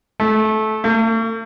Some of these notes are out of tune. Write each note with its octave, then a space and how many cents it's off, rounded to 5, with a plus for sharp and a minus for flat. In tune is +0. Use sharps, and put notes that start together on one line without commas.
A3 -20
A3 +45